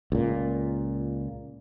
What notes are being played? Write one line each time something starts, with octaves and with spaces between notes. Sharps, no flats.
C#2 A#2